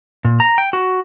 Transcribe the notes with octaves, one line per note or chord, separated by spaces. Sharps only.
A#2
A#5
G5
F#4